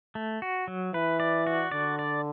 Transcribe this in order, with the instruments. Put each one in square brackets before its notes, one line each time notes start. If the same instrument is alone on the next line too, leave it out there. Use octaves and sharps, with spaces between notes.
[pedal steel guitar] A3
F#4
F#3
[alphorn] E3 [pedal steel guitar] B4
[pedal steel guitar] D5
F#4
[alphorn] D3 [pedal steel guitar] D5
[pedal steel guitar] D5